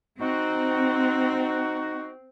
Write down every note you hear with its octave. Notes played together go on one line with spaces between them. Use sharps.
C4 D#4 F#4